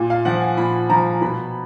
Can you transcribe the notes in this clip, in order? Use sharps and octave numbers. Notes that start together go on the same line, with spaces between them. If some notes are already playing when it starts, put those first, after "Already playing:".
Already playing: A#2
F5
F3 F#5
G#5
A#2 B5
F3 A#5
B2 B5